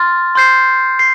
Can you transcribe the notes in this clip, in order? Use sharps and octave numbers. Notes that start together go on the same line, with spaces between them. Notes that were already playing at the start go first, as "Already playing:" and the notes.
Already playing: C6 F6 A6
C6 G6 C7
C7